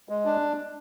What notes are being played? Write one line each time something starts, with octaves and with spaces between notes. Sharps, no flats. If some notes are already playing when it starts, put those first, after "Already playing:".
G#3
D4